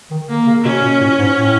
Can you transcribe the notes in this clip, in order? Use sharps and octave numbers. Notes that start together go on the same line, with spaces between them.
D#3
D3 A#3
C#3
B2 C#4
A#2
A2
G#2
A2